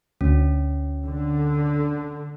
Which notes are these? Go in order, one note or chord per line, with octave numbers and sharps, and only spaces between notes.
D2 C#4
D3